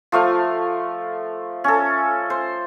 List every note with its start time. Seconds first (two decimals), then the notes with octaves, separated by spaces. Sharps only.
0.12 F3 A3 F5
1.64 C#4 A4
2.30 C5